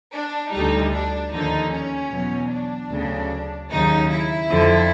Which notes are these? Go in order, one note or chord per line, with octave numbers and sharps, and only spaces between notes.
D4
D2 D3 G3 D#4
D4
D#2 D3 F3 D#4
C#4
E2 B2 F#3
D4
D2 C#3 F#3
D#2 C#3 F#3 D#4
E4
F2 D3 F3